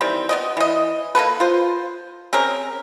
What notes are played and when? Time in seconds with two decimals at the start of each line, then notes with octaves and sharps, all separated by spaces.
0.01 D#3 E3 G3 C4
0.29 B3 D5 D#5
0.57 E3 D#5
1.15 A#3 B3 A4 B4
1.40 F4 C5
2.33 C4 C#4 G#4 A#4